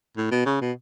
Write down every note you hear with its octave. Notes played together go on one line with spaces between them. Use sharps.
A2
B2
C#3
B2